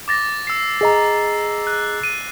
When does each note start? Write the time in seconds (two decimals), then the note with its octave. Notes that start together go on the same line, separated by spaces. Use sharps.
0.08 D6 A6 A#6
0.47 E6 C7
0.81 G#4 D#5 A#5
1.67 F#6
2.04 D#7